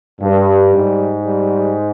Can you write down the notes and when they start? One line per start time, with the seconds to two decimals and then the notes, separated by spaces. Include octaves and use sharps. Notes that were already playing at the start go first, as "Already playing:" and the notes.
0.21 G2 G3
0.74 G#2
1.26 G3